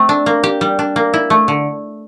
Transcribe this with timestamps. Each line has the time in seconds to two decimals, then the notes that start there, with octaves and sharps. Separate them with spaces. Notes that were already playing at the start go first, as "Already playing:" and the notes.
Already playing: A3 C4
0.09 D4
0.26 A#3
0.43 G4
0.61 G3
0.79 D4
0.96 A#3
1.14 E4
1.30 A3
1.48 D3